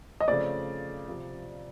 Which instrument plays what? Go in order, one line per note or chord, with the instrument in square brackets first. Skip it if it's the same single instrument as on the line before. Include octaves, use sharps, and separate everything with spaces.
[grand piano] D#5
[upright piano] C#3 F3 A3 C4 [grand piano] D5
[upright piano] C3 F3